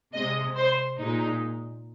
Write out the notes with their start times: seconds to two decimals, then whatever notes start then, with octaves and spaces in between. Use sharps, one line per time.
0.14 C3 G#3 D#5
0.56 C5
0.99 A#2 G#3 D#4